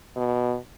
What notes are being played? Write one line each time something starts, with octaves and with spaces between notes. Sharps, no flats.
B2